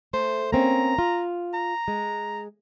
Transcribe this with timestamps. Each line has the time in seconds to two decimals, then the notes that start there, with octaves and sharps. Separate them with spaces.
0.14 A3 C5
0.53 A#3 C4 C#4 A#5
0.99 F4
1.54 A#5
1.88 G#3